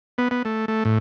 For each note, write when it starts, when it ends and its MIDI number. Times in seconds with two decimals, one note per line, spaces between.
0.18 0.28 59
0.31 0.43 59
0.45 0.65 57
0.68 0.84 57
0.85 0.98 45